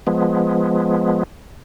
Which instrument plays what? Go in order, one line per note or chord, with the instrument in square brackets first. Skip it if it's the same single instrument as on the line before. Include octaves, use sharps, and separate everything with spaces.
[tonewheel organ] F3 G#3 B3